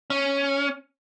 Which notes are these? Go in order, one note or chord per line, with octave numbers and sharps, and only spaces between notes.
C#4